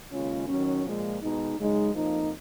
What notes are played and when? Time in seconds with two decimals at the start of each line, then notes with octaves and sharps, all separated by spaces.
0.11 D#2 C#3 G#3 C#4 F4
0.47 D#3 F#3 C#4
0.84 A#2 F3 G#3
1.20 B2 G#3 D#4
1.57 F#2 C#3 G#3 D#4
1.93 F2 F3 A#3 D#4